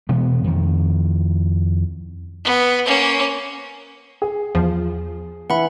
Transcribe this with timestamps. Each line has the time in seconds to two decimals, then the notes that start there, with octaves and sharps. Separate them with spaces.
0.09 B2 E3 G#3 B3
0.44 F2 D#3
2.44 B3
2.86 A#3 C#4
4.22 G#4
4.55 E2 F3
5.50 E3 F#5 B5